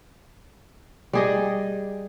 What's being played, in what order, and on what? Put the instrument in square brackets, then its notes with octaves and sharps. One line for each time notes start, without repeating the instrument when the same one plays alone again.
[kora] G3 G#4 D#5